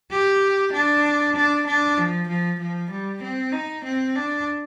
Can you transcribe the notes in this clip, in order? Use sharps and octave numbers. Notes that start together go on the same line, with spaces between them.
G4
D4
D4
D4
F3
F3
F3
G3
C4
D#4
C4
D4